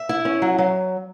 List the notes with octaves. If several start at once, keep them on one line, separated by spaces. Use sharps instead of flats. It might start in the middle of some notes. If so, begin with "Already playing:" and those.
Already playing: E5
E4
C#4
F#3
F#3